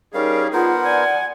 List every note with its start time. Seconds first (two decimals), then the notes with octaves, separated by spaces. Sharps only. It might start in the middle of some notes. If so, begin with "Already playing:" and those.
0.14 G3 C#4 D#4 G#4 A#4 F5
0.53 B3 F4 A#4 C5 F#5
0.85 D5 G#5